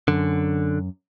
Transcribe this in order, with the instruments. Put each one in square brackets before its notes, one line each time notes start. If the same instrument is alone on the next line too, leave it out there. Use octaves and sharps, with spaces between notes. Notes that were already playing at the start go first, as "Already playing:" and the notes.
[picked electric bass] F#2 [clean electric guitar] D3